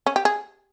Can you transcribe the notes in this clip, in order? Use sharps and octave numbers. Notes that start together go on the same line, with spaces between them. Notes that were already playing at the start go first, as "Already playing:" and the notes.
C#4
G4
G#4